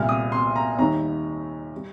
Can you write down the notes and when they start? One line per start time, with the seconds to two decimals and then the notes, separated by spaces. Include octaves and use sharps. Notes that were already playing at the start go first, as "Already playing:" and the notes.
Already playing: C2 A#2 G3 F6
0.09 D#6
0.32 C6
0.55 A#5
0.78 D#2 D#3 G3 A#5
1.76 G3